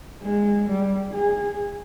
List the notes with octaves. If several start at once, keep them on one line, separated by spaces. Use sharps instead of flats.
G#3
G3
G#4